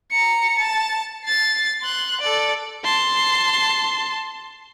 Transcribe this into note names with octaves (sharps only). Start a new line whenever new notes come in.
A#5 C#7
A5
A6 C7
C6 F#6
A4 D5
A5 C6